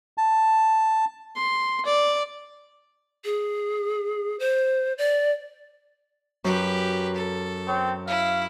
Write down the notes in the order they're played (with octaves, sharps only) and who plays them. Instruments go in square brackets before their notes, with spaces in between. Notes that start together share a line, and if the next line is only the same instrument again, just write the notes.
[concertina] A5
[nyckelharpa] C6
D5
[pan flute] G#4
C5
D5
[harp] F#2 [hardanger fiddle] G4 B4
[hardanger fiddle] A4
[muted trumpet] C4 [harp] C#5
[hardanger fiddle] E4 [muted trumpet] F5